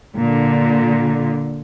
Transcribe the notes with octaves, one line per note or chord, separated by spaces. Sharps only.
A#2 D3